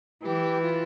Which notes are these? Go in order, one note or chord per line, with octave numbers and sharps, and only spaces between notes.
E3 G4
F4